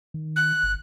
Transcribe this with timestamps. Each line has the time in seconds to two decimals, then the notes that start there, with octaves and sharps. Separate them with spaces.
0.14 D#3
0.36 F#6
0.63 G1